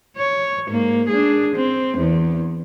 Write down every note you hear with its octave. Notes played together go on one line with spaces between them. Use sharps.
C#5
G#2 A#3
D4 G#4
C4
E2